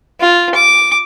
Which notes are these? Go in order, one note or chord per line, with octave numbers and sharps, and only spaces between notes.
F4
D6